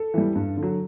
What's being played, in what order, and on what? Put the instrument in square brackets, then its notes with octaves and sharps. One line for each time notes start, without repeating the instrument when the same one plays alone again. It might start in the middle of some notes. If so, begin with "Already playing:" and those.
Already playing: [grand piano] A4
E3 G3
G2
D3
F#3